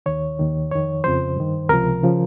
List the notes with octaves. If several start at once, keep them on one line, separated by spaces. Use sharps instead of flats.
D#2 D#3 C#5
D#2 D#3
F2 D#3 C#5
F2 C#3 F3 C5
G2 D#3
C#2 C3 F3 A#4
C#3 F3